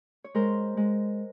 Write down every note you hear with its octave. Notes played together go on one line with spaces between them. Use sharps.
C#5
G#3 A#4 C5
G#3